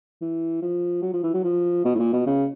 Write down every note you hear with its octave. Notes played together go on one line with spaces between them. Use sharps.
E3
F3
F#3
F3
E3
F#3
F3
B2
A2
A#2
B2
C#3